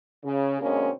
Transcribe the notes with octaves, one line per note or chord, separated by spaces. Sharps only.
C#3
B2 D3 G#3 A#3 C4 C#4